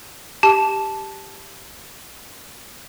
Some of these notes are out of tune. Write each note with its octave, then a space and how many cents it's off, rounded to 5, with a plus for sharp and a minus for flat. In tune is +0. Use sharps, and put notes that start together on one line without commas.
G4 +0 A5 -10